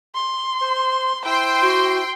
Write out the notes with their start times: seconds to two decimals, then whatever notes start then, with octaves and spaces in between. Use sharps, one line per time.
0.15 C6
0.61 C5
1.25 E4 C5 G5 C6
1.61 F#4